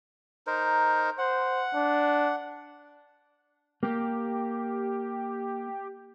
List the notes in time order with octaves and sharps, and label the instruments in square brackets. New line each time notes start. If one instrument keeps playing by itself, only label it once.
[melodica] D#4 A#4 C5
[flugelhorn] C5 [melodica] F#5
[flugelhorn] D4
[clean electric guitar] A#3 [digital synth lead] G4